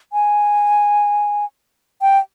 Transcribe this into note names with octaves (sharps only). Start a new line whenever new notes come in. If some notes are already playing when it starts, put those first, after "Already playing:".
G#5
G5